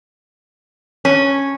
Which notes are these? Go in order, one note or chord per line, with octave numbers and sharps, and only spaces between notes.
C#4